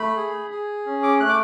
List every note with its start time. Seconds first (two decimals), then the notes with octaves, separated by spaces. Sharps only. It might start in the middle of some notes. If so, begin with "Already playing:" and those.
Already playing: A3 B5
0.16 G#4
0.50 G#4
0.86 C#4
1.03 D6
1.20 A3 F#6
1.29 D6